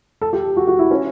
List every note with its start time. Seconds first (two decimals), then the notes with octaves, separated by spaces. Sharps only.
0.21 A4
0.33 G4
0.57 F#4
0.68 F#4
0.79 E4
0.91 C#4